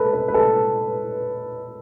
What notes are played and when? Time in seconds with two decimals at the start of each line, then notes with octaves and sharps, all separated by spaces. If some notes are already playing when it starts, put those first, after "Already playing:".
Already playing: A4 B4
0.13 B4
0.28 B4
0.34 A4